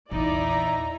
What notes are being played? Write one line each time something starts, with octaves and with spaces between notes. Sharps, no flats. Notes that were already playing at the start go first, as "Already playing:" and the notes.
A#1 E2 D#4 E4 D5 A#5